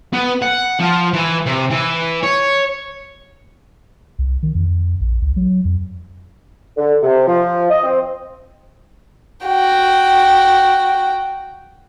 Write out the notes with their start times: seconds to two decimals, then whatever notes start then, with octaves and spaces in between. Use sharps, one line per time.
0.13 B3
0.42 F#5
0.80 F3
1.13 E3
1.46 C3
1.71 E3
2.23 C#5
4.19 C2
4.43 D#3
4.55 F2
5.01 A#1
5.22 C#2
5.36 F#3
5.65 F2
6.78 D3
7.03 C3
7.27 F3
7.70 D#5
7.84 C4
9.46 F#4 G5